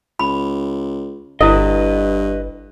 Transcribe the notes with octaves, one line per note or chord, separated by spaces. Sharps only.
C#2 B5
G1 G2 E4 A4 B4 D#5